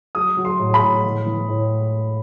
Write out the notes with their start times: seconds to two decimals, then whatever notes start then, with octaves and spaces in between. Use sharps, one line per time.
0.15 F#3 D#6
0.37 F#3
0.45 C6
0.60 A2
0.74 B5
0.82 A2
1.04 E3
1.26 E3
1.49 A2